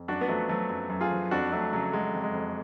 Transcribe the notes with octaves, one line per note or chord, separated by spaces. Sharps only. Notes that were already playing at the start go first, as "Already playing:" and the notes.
Already playing: F2
F#2 D4 F#4
B3
F3 F#3 A3
F3 F#3 A3
F#2
F#2
F4 G#4
F3
F2 D4 F#4
F2 F#3 A3
C#3 F#3
F#3 G#3
F2
G#3
F2